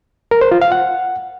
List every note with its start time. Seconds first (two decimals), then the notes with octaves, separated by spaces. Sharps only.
0.31 A#4
0.41 C5
0.51 F4
0.62 F5
0.72 F#5